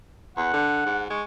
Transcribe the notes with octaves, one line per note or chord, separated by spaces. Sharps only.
E2 F#5
D3
G#2
G#3 C#6